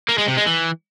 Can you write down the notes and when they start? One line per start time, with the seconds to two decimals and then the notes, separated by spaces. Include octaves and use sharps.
0.09 A#3
0.18 G#3
0.28 C3
0.37 G#3
0.46 E3